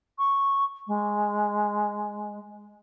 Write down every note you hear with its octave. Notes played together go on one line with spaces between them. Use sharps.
C#6
G#3